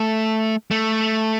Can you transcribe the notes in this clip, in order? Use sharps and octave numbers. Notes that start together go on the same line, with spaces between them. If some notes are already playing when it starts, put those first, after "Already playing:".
Already playing: A3
A3